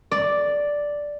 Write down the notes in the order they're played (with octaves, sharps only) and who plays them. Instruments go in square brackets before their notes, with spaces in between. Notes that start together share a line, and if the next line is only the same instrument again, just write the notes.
[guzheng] D5